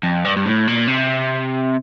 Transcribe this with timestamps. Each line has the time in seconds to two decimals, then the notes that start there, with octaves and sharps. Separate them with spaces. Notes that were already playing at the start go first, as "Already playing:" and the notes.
0.03 F2
0.24 G2
0.36 G2
0.46 A2
0.67 A#2
0.87 C3